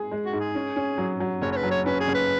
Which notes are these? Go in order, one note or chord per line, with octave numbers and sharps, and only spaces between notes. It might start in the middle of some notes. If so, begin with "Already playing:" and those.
Already playing: G#3 G#4
G#3
F#4
G#2
G#4
C#4
C#4
F#3
F#3
F#1 C#5
C#5
B4
F#3
C#5
C#4 B4
G#4
F#1
B4